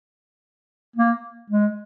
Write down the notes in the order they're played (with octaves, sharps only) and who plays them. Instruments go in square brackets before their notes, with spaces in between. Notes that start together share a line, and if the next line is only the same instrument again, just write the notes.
[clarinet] A#3
G#3